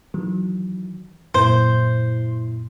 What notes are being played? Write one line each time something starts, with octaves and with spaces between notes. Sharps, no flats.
D#3 E3 F#3
F#2 A#2 E4 C5